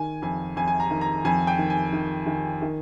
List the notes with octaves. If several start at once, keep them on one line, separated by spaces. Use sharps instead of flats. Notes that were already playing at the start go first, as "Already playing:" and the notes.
Already playing: D#3 G#5
F2 G#5
F2 G#5
G#5
A#5
D#3
A#5
F2 G#5
G5
D#3
G#5
D#3
D#3
D#3